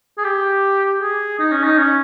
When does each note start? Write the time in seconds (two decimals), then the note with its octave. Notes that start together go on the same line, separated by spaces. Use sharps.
0.18 G#4
0.24 G4
1.01 G#4
1.39 D#4
1.52 C#4
1.64 D#4
1.78 C#4